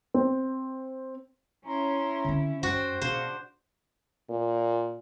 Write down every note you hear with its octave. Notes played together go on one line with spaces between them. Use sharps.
C4
C#4 E4 C#5 A#5 C6
D3 C4
F#2 F#3 F#4 C5 G5
B2 D4 F#4 C5 F5
A#2